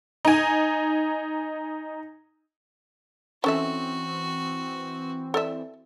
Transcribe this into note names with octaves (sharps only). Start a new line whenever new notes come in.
D#4 G#5
E3 C4 C#4 F#4 A4 E5
A4 D5 E5